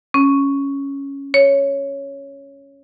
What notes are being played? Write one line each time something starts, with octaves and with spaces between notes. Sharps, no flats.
C#4
C#5